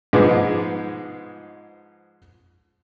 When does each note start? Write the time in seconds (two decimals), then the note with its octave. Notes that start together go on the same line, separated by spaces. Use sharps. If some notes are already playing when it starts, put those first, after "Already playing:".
0.13 G#2 F3 G#3 B3 D6